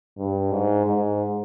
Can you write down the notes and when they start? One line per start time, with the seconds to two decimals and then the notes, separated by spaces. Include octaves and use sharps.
0.17 G2
0.51 G#2
0.86 G#2